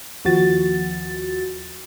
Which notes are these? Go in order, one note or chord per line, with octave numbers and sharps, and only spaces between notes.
D#2 F3 F#4 A6